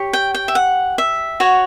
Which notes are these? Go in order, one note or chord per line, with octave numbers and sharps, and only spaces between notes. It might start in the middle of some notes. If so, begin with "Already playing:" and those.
Already playing: G4 C#5
G5
G5
E5
F#5
E5
F#4 C#5 F#5